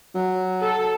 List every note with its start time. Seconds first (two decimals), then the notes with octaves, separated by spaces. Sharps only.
0.15 F#3
0.62 A4